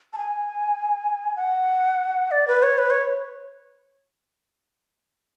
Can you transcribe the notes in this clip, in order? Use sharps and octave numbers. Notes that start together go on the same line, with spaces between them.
A5
G#5
F#5
D5
B4
C#5
B4
C#5